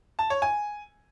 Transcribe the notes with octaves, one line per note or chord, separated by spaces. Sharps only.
A5
C#5
G#5